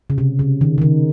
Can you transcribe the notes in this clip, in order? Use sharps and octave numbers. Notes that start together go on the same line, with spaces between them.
C#3
C3
C#3
D#3
C#3
D#3